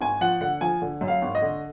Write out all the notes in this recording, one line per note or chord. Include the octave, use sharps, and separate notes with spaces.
G#1 G#5
F3 F#5
D3 F#5
F3 G#5
D3
F#2
F5
G#1
D#5
D3